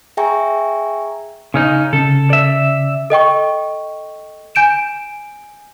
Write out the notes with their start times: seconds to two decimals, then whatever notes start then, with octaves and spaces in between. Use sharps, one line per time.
0.17 G#4 E5 G5 G#5 A#5 C#6
1.54 C#3 C#4 D#4
1.93 C#3 C#4 A4
2.30 D5 E5
3.10 A4 D#5 G5 C#6
4.55 G#5 G6 D7 E7